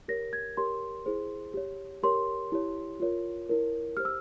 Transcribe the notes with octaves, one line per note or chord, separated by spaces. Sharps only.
G4 A#4 C#5 A#6
G#6
G4 A#4 C#5 C6
E4 G#4 C5
G4 C#5
G4 A#4 C#5 C6
E4 G4 C#5
F4 A#4 C#5
E4 A#4 C#5
G4 C5 F6
E6